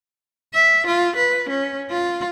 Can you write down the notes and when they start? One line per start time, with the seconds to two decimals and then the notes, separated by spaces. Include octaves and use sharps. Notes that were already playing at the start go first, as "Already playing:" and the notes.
0.54 E5
0.87 F4
1.17 B4
1.50 C#4
1.90 F4